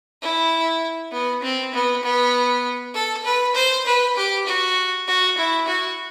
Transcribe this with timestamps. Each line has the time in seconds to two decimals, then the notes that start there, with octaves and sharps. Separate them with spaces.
0.22 E4
1.12 B3
1.42 C4
1.74 B3
2.03 B3
2.95 A4
3.25 B4
3.55 C5
3.86 B4
4.16 G4
4.47 F#4
5.08 F#4
5.38 E4
5.67 F#4